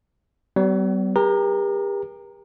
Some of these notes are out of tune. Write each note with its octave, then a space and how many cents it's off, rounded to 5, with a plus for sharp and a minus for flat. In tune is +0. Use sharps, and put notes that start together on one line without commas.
G3 -45 B3 +30
G4 +40 A#4 +40 A#5 -10